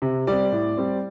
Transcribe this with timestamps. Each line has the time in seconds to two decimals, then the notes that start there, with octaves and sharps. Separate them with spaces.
0.02 C3
0.27 G3 C4 D5
0.52 A2
0.77 G3 C4